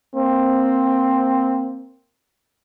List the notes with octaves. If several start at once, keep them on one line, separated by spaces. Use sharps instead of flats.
A#3 C4